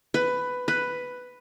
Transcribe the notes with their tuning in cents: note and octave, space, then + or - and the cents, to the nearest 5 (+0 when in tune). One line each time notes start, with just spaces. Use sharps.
B4 +10
B4 +5